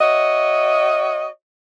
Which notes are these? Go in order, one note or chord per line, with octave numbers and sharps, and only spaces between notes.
F#4 C#5 D#5 E5